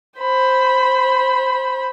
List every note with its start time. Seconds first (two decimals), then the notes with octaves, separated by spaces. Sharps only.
0.19 C5 B5